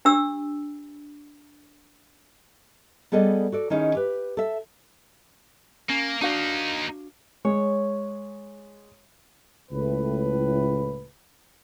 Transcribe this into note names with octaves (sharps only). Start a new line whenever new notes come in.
D4 G4 E6
G3 B3 G#4 A4 D5 D#5
F#4 A4 D5
D#3 C#4 D#4 E4 G#4
G4 B4
A4 E5
A#3 C#4
A#3 D4 D#4 F#4 F5
G#3 C#5
C#2 A2 B4